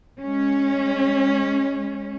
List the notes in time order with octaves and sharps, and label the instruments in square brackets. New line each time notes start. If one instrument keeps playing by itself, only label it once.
[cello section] G#3 C#4